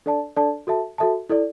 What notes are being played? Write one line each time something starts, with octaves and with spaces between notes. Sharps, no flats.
D4 A4 D5 A5
D4 A4 D5 A5
F#4 A4 E5 A5
F#4 A4 E5 A5
E4 A4 D5